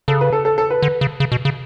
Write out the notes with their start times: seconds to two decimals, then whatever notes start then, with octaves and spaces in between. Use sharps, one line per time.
0.08 C#3 A4
0.21 B4
0.33 A4
0.45 A4
0.58 A4
0.70 B4
0.82 D3
1.01 C#3
1.20 C#3
1.32 B2
1.45 C#3